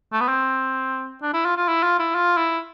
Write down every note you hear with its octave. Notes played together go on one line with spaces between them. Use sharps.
A3
B3
C4
D4
E4
F4
F4
E4
F4
E4
F4
E4